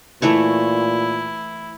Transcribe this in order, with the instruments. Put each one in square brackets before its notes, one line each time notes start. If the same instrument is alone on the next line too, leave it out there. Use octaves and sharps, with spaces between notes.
[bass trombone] A#2 [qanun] E3 A3 C#5 [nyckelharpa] E4